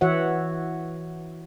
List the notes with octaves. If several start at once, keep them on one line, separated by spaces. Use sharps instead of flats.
E3 F#4 C#5 E5 F#5